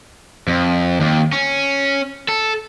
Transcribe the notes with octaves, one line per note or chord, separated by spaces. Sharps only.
F2
D#2
C#4
A4